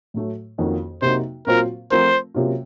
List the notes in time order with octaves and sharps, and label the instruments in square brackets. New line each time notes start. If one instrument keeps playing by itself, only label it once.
[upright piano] A2 F#3 A3
F2 D#3 A#3 C#4 F#4
[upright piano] C3 F#3 A#3 D#4 F#4 [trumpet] C5
[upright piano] A#2 F#3 C4 F4 C5 [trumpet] A#4
[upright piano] F3 A3 C4 F4 A#4 [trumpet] C5
[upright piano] C3 F#3 A#3 C#4 F4